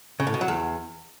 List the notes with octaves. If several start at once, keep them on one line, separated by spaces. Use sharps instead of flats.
C#3
A2
B2
F#3
E2